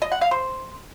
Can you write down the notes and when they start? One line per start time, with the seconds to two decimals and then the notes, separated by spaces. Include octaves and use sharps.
0.02 D#5
0.12 F#5
0.21 F5
0.31 C5